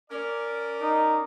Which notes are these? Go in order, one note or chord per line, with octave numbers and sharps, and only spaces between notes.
C#4 A#4 D5
D#4